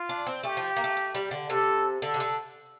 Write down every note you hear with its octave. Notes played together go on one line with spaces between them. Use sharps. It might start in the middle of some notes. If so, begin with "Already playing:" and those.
Already playing: F4
D4
C4
A3 G4
F3
A#3
A3
A3
G3
D3
C3 A4
D3 A4
C3
D3